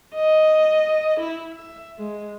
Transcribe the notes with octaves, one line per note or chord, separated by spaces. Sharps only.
D#5
E4
E5
G#3